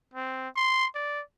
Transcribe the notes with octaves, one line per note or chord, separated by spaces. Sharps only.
C4
C6
D5